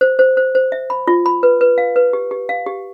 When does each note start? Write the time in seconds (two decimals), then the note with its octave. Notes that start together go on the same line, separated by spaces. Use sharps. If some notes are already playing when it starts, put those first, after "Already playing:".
0.01 C5
0.19 C5
0.37 C5
0.55 C5
0.72 E5
0.90 B5
1.07 F4
1.26 B5
1.43 B4
1.61 B4
1.78 F5
1.96 B4
2.13 G4
2.31 G4
2.49 F5
2.66 G4